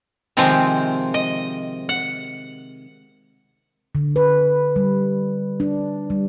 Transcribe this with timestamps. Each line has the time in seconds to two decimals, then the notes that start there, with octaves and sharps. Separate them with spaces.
0.37 C3 D#3 F3 G#3 C4
1.14 D#5
1.89 F#5
3.95 D3
4.16 B4
4.76 G3
5.60 D4
6.10 G3